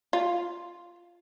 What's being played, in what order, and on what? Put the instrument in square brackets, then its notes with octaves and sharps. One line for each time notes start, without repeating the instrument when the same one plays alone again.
[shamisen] F4